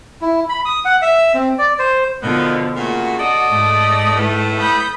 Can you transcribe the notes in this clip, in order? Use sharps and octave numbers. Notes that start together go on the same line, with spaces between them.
E4
B5
D#6
F#5
E5
C4
D5
C5
B2 D3 D#3 F3 B3 F4
A#2 C#3 A3 F#4
A4 D5 D#5
G#2 A3
A2 A4 B4
B5 D#6 G6